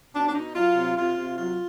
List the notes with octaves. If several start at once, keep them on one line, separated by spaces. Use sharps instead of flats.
B2 D4
D4
B2 D#4
F#3 F4
C3
C3 F4
C3
F#3 F4